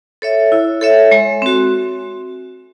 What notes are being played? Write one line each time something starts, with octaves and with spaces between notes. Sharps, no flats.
A4 C#5 E5
E4
A4 C#5 E5
G#3
C4 F#4